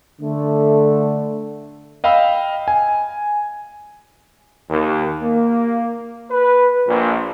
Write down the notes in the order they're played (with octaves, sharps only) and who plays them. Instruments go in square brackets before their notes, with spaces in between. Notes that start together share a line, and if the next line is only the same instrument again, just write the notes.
[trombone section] D3 A3
[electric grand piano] D#5 F5 G5 B5 E6
G#5
[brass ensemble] D#2
A#3
B4
A#1